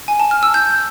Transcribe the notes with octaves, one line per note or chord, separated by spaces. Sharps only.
G#5
A5
F6
E6
G6